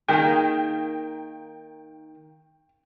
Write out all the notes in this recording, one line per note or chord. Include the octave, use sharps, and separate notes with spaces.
D#3 A#3 G#4 A#4 G5